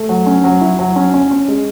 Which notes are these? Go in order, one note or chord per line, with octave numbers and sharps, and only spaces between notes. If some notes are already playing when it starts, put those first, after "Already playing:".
Already playing: A3
F#3
C#4
F#3
E4
F#3
C#4
C#4
C#4
G#3